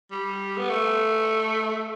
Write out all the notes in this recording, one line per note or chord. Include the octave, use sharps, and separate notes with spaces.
G3
B3
A3